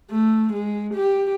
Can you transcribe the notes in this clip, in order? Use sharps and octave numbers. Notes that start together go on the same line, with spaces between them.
A3
G#3
G4